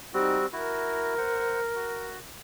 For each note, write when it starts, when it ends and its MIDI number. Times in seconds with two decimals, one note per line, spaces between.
0.14 0.46 55
0.14 0.46 60
0.14 0.38 63
0.14 0.46 66
0.53 1.15 64
0.53 1.15 66
0.53 2.22 70
1.18 1.60 72
1.18 1.60 78
1.76 2.19 66